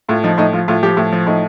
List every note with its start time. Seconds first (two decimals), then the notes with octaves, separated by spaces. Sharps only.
0.09 A2 F4
0.23 F3 D#4
0.38 A2 D#4
0.53 F3 F4
0.68 A2 F4
0.83 F3 G4
0.97 A2
1.12 F3
1.27 A2 D#4